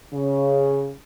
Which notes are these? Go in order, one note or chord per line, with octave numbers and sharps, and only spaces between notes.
C#3